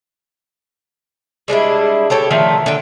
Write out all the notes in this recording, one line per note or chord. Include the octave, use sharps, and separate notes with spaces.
G3 G#3 D4 E4
G4 A4 C#5 G5
D3 D#3 F3 A3
D3 G5